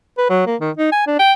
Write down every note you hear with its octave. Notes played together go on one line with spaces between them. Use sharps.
B4
F#3
A#3
D#3
D#4
G#5
D4
G5